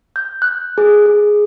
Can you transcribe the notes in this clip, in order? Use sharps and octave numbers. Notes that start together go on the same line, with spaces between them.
G6
F#6
G#4
G#4